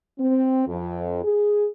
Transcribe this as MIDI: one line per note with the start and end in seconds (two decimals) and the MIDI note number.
0.19 0.63 60
0.67 1.21 41
1.23 1.67 68